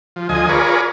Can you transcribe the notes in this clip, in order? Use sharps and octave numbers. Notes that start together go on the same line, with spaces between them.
F3
D2 F3 D#5 G#5
F4 G#4 A#4 B4 C#5 D5